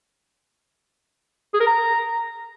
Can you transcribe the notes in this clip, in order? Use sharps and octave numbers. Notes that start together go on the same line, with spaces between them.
G#4
A#4
A#5